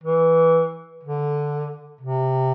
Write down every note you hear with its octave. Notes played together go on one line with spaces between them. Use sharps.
E3
D3
C3